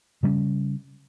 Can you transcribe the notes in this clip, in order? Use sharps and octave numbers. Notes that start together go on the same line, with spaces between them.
C#3 G3 B3 C#4